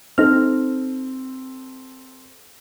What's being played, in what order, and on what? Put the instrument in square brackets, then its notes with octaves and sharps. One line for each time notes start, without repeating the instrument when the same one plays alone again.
[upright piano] C4 A4 [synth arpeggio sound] D#4 F6